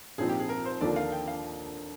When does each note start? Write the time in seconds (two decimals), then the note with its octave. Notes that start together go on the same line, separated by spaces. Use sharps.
0.18 A#1 G#2 F3 C4 D#4 G#4
0.29 G4
0.39 G#4
0.49 A#4
0.65 C5
0.81 D#2 D3 F3 A#3 D4 D5
0.96 F5
1.12 G5
1.28 F5